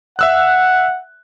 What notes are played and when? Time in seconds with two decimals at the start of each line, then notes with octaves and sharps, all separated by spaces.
0.19 E5 F#5 E6 F#6